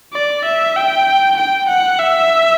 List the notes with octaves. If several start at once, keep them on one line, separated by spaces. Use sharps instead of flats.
D5
E5
G5
G5
F#5
E5